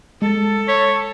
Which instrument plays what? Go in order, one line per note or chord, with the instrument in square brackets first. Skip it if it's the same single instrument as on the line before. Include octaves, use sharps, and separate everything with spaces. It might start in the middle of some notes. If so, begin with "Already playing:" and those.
[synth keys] G#3 A6 [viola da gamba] A4
[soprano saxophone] C#5 [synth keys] B6